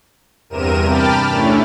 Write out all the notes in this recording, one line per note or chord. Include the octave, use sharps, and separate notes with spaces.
E2 G2 C3 A#4 D#7 E7
G5 A5 B5 D6 F6 A6
A3 C#4 D4 E4